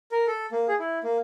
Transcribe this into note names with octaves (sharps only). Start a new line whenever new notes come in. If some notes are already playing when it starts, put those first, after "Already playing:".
A#4
A4
A#3
G#4
E4
A#3